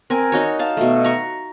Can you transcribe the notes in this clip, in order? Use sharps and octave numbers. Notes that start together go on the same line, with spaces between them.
C4 A#4 G#5
D#4 F#4 C#5
F5 A5
B2 A3
A#5 C#6